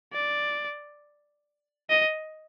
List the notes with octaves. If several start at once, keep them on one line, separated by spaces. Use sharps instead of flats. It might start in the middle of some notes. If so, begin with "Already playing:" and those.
D5
D#5